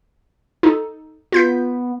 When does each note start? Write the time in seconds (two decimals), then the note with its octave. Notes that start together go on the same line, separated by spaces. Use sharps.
0.63 D#4 A4
1.32 B3 F4 G6 B6